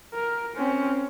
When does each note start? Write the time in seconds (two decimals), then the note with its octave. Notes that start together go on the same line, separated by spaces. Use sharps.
0.14 A#4
0.56 C4 C#4